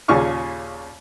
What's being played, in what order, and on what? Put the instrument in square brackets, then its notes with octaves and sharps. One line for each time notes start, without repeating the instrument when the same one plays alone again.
[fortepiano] D#2 A#2 C#3 G#5 C#6 F6